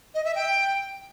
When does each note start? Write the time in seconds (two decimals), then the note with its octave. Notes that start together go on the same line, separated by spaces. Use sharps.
0.14 D#5
0.25 E5
0.35 G5